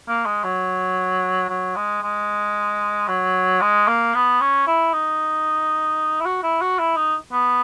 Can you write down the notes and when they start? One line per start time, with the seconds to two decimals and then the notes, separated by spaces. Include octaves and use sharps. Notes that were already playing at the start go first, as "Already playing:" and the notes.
0.08 A#3
0.26 G#3
0.44 F#3
1.49 F#3
1.76 G#3
2.02 G#3
3.08 F#3
3.61 G#3
3.88 A#3
4.14 B3
4.41 C#4
4.67 E4
4.93 D#4
6.20 E4
6.26 F#4
6.43 E4
6.61 F#4
6.79 E4
6.96 D#4
7.32 B3